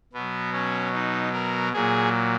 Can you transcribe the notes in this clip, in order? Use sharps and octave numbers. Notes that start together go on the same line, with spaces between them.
B2 F#3 B3
C#4
D#4
A#4
A#2 F#3 G#4